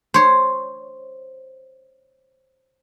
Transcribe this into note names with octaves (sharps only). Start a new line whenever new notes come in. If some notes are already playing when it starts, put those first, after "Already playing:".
C5 C#5